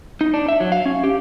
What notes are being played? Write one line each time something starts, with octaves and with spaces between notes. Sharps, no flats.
D#4
D4
E5
F#3
F5
C#4
G4